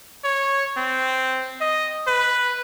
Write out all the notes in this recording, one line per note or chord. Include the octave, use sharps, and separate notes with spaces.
C#5
C4
D#5
B4